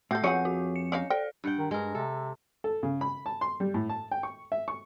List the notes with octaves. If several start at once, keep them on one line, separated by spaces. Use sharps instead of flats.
A2 F#4 A4 E5 G6
F2 F#3 B3 G#4 C#5 F#5
F#4
C#7
C#4 D#4 F5
A4 D5 G5
G2 F#5 G5
D#3
G2 G#3 A#4
C3 A4
A4
C#3
B5
A5
C6
G3
A2
A5
G5
C#6
E5
C#6